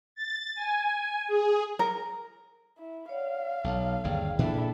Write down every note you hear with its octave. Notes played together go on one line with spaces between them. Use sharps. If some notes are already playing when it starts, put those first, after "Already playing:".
A6
G#5
G#4
A#4
E4
C#5 D5 F5 F#5
B1 A4 C#5 A5
G1 D#2 G#4 D5 G5
A#2 E3 D4 E4 A4